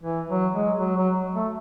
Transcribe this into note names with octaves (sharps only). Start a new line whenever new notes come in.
E3
F#3
G#3
F#3
F#3
A3